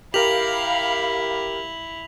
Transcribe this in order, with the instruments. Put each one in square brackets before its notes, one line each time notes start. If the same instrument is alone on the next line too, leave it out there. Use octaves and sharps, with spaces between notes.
[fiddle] E4 [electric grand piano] G4 A#4 [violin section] F5 B5 [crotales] B6 F7 F#7